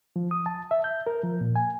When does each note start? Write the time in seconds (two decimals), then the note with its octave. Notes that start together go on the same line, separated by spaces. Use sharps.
0.16 F3
0.31 D#6
0.46 A5
0.71 E5
0.84 G6
1.07 A#4
1.24 F3
1.41 A#2
1.56 G#5